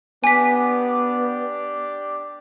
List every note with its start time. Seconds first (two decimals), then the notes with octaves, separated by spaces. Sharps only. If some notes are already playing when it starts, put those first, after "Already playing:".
0.24 B3 D4 G4 D5 G#5 B6